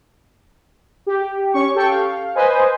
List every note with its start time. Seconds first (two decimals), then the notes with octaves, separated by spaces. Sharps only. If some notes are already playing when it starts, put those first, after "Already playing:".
1.06 G4
1.53 C#4 C#6
1.74 G4 A4 G5 C#6
1.88 F5
2.35 B4 C5 D#5 G#5